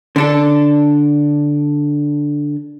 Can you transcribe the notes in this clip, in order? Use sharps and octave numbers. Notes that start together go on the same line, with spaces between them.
D3 D4 A4